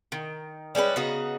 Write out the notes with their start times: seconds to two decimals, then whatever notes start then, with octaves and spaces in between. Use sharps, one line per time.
0.12 D#3
0.75 G3 G#3 C#4 B4
0.96 C#3 B3 D#4 F#4